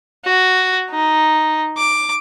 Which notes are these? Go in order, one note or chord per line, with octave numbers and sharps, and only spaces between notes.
F#4
D#4
D6